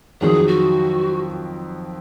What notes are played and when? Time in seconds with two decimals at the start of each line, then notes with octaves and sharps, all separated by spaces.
0.21 F2 D#3 F#3 G#4
0.47 F#4